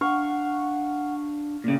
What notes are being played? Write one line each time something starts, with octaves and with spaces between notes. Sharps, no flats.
D4 F5 F#5 C#6
A#2 C#3